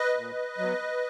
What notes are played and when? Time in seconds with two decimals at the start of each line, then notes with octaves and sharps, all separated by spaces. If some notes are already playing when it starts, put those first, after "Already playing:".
Already playing: B4 D#5
0.17 A#2
0.58 F#3 B3